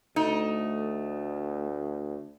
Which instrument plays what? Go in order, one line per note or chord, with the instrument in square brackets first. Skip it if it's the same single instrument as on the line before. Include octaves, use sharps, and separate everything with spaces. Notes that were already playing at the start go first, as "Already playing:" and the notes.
[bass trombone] D2 [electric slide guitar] A3 [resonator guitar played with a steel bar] D#4